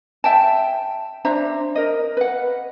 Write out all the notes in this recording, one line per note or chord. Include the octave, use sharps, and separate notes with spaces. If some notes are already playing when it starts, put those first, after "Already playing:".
E5 G5 A5
D4 C5 E5 A#5
A#4 D#5
B4 F#5